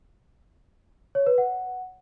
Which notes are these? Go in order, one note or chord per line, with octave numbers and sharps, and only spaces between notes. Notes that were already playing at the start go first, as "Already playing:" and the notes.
C#5
B4
F#5